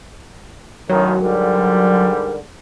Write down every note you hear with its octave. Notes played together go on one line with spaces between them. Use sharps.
A1 F#2 D#3 F#3
G#2 D3 G3 A#4